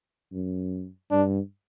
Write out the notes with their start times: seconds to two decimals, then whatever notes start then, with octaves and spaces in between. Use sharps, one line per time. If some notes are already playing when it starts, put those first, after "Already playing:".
0.32 F#2
1.11 G2 D4